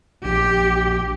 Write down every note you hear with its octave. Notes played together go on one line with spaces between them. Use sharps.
A#1 G4